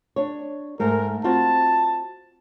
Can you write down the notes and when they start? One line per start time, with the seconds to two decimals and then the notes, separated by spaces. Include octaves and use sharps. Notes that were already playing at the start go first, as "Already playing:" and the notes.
0.16 D4 C#5
0.80 G#2 A3 A#4
1.24 C4 F4 F#4 A5